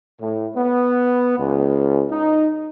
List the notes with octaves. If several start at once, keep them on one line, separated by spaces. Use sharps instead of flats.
A2
B3
C#2
D#4